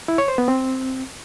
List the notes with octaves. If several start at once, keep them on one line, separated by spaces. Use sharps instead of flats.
E4
C#5
C5
B3
C4